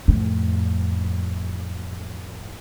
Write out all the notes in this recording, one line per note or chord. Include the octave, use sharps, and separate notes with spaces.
F2 A2